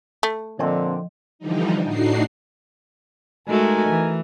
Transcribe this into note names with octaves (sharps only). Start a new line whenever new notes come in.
A3
A#2 D3 F3 C4 D#5 G5
D3 E3 F3 G3 D#4
A2 D4 D#4 F#4 C7
G#3 A3 D#4 F#4 A#4 G#5
E3